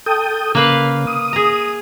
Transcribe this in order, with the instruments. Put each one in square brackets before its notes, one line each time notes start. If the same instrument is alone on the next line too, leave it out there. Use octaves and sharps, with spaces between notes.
[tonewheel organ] A4 G5 D#6
[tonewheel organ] C#3 [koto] A#3 B4 F5
[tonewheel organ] D#6
[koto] G#4 A#5